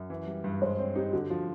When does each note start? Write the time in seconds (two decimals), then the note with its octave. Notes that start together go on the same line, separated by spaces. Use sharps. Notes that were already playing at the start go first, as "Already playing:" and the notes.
Already playing: F#2
0.10 E3
0.27 G3
0.44 G2
0.62 G#3 C5
0.78 C4 C#5
0.95 D#4 G4
1.13 D3 F#4
1.30 F3 F4